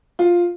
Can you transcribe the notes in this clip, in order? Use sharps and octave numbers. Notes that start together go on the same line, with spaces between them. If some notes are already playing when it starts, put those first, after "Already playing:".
F4